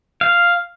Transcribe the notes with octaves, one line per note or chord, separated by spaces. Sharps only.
F5